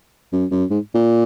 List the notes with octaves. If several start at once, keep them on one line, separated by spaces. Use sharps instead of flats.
F#2
F#2
G#2
A#2